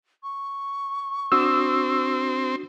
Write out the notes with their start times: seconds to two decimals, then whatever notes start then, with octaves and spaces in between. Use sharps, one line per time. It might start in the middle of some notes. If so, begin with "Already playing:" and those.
0.23 C#6
1.32 C4 D4 F#4 D#6 E6